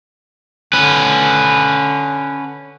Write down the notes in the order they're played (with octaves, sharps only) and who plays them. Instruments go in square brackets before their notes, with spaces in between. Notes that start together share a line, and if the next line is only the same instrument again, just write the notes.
[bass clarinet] D3 [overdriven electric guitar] C#4 B4